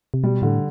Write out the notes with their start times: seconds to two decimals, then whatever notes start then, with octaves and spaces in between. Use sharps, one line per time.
0.14 C3
0.24 B2 G3
0.42 A2 D3